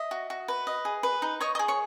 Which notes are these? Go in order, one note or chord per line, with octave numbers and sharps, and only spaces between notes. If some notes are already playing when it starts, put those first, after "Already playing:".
Already playing: D#5 E5
F#4
F#4
B4
D#5
G#4
B4
D#4
C#5 D#5 C#6
G#4 D#5 D#6
C#5 C#6